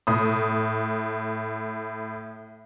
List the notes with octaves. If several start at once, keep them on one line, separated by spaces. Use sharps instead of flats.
A2 D#6